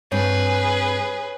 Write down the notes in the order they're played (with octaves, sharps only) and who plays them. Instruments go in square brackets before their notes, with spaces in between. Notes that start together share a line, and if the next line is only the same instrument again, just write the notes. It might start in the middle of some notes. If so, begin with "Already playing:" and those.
[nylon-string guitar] G2 C4 D4 [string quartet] G#4 B4 [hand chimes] C#5